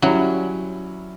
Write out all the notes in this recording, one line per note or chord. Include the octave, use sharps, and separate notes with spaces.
F#3 G3 C#4 E4